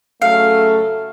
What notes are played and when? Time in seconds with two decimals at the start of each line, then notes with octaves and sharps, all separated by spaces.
0.22 C#3 F#3 A3 F5